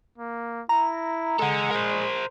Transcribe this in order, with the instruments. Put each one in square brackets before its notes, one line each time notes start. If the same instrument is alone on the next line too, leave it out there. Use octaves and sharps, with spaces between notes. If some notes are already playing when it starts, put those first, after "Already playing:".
[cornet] A#3
[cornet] E4 [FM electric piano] A#5
[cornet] G#3 [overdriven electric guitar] A4 F#5
[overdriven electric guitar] A#4 C5